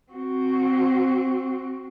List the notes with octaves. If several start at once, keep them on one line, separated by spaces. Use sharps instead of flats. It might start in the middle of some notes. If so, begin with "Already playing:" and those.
C4 F#4